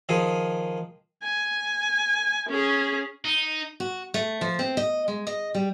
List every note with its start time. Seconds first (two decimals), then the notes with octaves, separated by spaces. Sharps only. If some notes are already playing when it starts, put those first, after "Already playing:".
0.09 D#3 F3 G#4
1.23 G#5
2.49 C#4 G#4
3.25 D#4
3.80 F#4
4.14 A3
4.41 F3
4.59 C4
4.77 D#5
5.08 G#3
5.27 D#5
5.55 G3